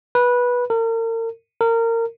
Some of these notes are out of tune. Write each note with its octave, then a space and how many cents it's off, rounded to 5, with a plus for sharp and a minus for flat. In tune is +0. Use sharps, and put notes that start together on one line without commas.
B4 -15
A#4 -40
A#4 -25